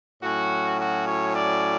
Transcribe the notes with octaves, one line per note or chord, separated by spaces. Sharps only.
A2 F#3 C#4 F#4
F#4
C#5
D5